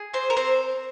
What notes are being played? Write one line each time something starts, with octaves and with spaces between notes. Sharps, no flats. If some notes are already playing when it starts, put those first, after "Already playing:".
Already playing: G#4
C4 C5
A#4
C4 C5